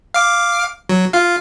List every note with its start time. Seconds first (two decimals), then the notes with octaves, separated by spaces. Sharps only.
0.14 F5 D6
0.89 F#3
1.13 F4 F5